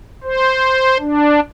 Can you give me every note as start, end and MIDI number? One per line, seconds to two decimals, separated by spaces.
0.24 0.97 72
0.99 1.40 62